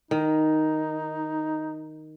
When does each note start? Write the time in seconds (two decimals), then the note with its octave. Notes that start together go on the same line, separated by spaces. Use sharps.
0.11 D#3 D#4